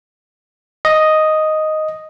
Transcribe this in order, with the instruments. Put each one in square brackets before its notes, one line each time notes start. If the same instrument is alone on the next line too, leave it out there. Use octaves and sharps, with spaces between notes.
[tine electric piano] D#5